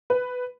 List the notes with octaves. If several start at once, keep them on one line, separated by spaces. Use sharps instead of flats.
B4